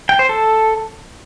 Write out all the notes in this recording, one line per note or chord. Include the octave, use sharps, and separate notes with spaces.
G5
C5
A4